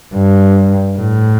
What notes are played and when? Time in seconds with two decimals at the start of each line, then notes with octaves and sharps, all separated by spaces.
0.15 G2
0.98 A2